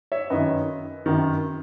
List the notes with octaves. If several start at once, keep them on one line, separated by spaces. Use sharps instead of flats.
C#5 E5
F#2 D#3 B4 D#5
F#2 D#3